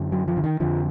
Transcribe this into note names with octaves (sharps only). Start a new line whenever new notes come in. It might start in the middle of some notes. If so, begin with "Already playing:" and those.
Already playing: F#2 D3
F#3
F3
D3
D#3
F2 D3 F3